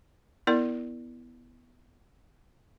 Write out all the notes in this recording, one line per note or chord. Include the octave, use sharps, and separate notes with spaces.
B3 E4 A#4 D5